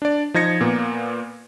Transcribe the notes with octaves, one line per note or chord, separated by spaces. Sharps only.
D4 D5
F3 D#4 G#6 A#6 C#7
A#2 A#3 B3